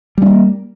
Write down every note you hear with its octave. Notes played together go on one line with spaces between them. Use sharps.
G3 A#3 C#4